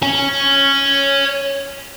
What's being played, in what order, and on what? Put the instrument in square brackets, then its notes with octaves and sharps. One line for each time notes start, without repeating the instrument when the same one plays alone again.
[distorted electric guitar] C#5 G#5